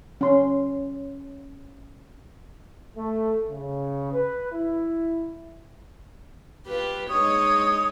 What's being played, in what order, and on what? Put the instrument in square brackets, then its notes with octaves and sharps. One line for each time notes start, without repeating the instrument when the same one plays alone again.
[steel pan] C#4 C6
[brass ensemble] A3
C#3
B4
E4
[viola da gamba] F4 G4 B4
[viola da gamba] G#3 D#4 C#5 [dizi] D#6